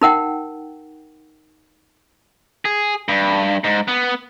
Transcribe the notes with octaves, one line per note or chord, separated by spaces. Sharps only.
D#4 A#4 F#5 G5
G#4
G2
G#2
B3